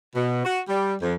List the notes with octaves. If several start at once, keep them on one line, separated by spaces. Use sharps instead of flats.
B2
F#4
G3
F2